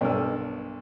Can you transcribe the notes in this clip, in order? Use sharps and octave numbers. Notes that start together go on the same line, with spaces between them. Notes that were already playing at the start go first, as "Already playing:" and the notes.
B1 G2 A3 A#4 E6